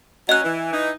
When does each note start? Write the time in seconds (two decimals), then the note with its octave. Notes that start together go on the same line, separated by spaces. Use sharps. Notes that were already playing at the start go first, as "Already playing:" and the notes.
0.29 F#3 C#4 D#5 F#6
0.44 E3
0.72 E3 D#4